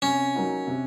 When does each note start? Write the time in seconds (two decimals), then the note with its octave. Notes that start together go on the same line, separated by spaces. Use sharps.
0.02 C3 C#4
0.35 F#3 A#3 D#4 F#4
0.67 C3